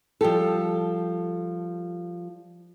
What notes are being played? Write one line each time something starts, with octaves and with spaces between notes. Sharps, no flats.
F3 G3 G4 A4